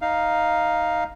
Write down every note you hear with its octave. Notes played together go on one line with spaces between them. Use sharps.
D#4 F5